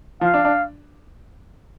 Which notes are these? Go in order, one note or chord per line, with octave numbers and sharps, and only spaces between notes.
F3 F5
D4
D4